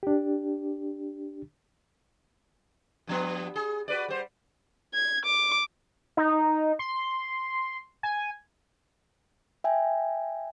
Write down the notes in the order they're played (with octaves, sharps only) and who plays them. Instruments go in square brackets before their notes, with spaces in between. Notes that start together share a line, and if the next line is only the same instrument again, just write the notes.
[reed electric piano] D4 G4
[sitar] G2 F3 B3
G#4
F#4 B4 D5
G3 C5
[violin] G#6
D6
[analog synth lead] D#4
C6
G#5
[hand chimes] E5 G5 G#5